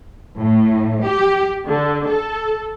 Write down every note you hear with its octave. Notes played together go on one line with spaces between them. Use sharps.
A2
G4
D3
A4